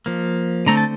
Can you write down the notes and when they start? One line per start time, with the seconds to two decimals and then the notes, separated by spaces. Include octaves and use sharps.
0.06 F3 A#3
0.66 D3 A3 C4 A#5
0.77 A5